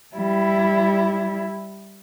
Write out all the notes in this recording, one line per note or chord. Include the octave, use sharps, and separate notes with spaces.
G3 E4